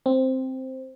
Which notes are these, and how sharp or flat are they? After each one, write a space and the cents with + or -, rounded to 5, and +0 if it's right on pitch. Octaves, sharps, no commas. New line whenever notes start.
C4 +0